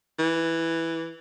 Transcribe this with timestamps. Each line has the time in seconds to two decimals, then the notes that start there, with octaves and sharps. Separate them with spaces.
0.19 E3